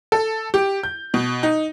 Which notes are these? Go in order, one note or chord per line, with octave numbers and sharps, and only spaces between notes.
A4
G4
G6
B2
D#4